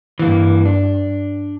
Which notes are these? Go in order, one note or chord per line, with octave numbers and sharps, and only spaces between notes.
G2 E3 A#3
D4